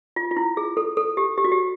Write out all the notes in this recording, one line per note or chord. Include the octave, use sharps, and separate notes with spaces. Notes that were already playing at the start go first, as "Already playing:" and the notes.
F4
F4
E4
G#4
A4
A4
G4
G4
F#4
G4